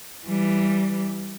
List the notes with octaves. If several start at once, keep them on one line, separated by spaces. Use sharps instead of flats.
E3 G3